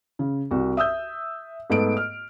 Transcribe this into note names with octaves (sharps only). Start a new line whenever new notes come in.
C#3
C2 F#4
E5 D#6 E6 G6
G#2 A3 B3 A4 D7
F6